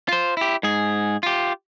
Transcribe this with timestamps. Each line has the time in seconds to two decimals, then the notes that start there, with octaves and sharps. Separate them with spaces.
0.08 F4 C5
0.37 E4 G4
0.63 G#2 G#4
1.23 F4 G4